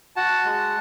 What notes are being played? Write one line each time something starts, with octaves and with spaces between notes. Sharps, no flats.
F#4 F#5 A5
G#3